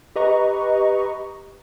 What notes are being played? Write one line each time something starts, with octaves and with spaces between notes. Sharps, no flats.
G4 B4 D#5 A#5 C#6